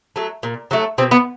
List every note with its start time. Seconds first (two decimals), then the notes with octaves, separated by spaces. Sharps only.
0.16 F#3 A3
0.43 A#2
0.71 F#3 A3
0.98 B2 C4
1.11 B3